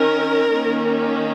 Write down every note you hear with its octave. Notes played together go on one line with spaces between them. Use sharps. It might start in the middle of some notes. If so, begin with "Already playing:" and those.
Already playing: D#3 C#4 A#4
D#3 A#3 C#4